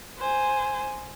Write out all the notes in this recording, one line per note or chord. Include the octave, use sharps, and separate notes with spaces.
C5 G#5